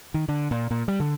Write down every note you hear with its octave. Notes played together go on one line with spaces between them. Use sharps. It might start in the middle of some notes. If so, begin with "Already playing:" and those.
D#3
D3
A#2
A#2
G3
D3